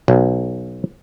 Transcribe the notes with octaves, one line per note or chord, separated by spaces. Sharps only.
B1